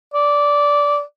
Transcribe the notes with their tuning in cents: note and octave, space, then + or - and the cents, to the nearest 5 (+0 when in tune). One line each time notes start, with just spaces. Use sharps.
D5 -15